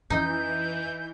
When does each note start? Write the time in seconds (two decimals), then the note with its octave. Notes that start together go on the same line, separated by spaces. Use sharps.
0.10 F2 E3 C#4 D#4 G6